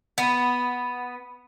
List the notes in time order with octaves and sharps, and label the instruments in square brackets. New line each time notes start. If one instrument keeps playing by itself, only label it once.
[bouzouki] B3